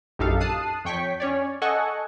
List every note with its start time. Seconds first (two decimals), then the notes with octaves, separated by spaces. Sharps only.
0.19 A#1 F#2 D#4 G4 A4 F5
0.40 A5 D#6 F#6 C7 D#7
0.85 F2 C#5 G5 C#6 B6
1.20 C#4 C#5 D5
1.62 A4 D#5 F#5 G#5 C#6